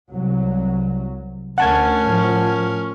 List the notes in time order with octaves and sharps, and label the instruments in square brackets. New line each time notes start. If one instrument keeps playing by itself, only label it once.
[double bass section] C2 F#3
[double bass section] D2 [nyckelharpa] C#4 A#4 [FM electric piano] F#5 A5 G#6
[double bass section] A2 F3